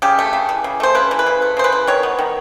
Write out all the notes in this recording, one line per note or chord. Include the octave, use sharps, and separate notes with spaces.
C#3 G4
A3
C#3
E3
C#3
A3 C5
C#3 B4
E3
B4
C#3
A3
C#3 C5
B4
E3
D#3 C#5
B3
D#3